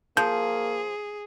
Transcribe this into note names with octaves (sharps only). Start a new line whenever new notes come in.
F3 A#3 G#4 G6